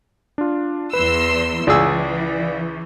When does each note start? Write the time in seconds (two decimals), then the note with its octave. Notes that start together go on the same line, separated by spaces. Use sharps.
0.38 D4 F4
0.93 E2 B4 C6 E6
1.67 C#2 E3 G#4 D5 F5 E6